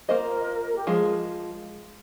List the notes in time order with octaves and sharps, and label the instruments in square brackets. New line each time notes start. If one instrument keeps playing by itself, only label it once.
[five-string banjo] A#3 F4 C5 D#5 [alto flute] A#4
[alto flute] G4
[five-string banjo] F3 G#3 [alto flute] G#4